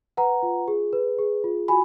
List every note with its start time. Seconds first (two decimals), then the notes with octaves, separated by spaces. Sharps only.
0.17 B4 F#5 A#5
0.43 F4
0.68 G#4
0.93 B4
1.19 G#4
1.44 F4
1.68 F#4 G#5 B5